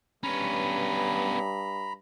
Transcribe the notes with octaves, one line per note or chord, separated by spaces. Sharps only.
G2 B3 C#4 A#5 B5